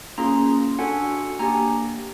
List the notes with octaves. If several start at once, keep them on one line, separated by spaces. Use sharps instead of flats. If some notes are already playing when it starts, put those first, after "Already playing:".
A#3 C#4 F4 G#4 A#5 C6
D4 F#4 A4 F#5 G#5
A#3 D4 G4 G#5 A#5